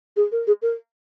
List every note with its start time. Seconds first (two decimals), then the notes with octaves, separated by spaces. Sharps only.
0.16 G#4
0.32 A#4
0.47 G#4
0.62 A#4